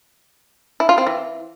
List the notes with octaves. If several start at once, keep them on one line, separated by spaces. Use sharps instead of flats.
E4
F4
C4
E3